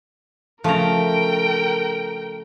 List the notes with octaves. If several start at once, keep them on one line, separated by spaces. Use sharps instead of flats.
C#3 F3 A3 A#4 G5 A#5